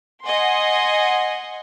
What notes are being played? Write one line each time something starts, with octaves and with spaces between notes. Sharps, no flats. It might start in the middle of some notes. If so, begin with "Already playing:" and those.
D#5 F#5 G#5 C6